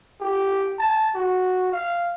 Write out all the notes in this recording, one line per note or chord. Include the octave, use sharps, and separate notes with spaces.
G4
A5
F#4
F5